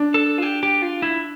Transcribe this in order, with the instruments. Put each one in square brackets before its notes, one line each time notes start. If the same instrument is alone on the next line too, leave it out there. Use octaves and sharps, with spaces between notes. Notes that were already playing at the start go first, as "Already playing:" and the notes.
Already playing: [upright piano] D4
[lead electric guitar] A4
F4
G4
G4
F4
E4